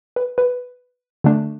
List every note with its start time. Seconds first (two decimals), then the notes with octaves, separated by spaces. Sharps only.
0.16 B4
0.38 B4
1.24 D3 A3 D4